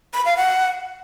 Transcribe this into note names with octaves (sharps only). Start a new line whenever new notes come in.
B5
F5
F#5